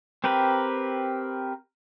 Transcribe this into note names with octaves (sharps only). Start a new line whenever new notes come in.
C4 G4 A#4 B4